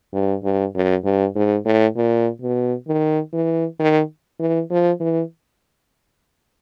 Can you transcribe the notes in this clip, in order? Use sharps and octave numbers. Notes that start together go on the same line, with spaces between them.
G2
G2
F#2
G2
G#2
A2
A#2
B2
D#3
E3
D#3
E3
F3
E3